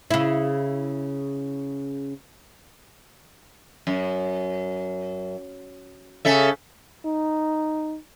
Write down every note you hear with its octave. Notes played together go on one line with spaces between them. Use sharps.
C#3 E4
F#2
C#3 A4 E5
D#4